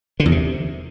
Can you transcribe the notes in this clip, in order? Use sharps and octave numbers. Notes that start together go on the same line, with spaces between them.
D3
E2
C3